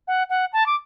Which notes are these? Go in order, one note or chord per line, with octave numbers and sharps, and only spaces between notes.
F#5
F#5
A5
D6